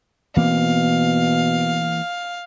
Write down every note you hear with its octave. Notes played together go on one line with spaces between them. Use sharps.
B2 E3 A#3 C4 F5